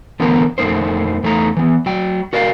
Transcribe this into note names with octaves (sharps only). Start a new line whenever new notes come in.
D3 E3 B3 C4 A#4 A#5
F2 A3 A#3 D#4 C5
E2 A3 D#4 A#5
E3 B3
F#3 G5
F#4 A#4 D5 D#5 F5